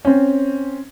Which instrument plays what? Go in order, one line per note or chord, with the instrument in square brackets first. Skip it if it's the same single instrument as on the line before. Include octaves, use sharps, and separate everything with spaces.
[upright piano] C4 C#4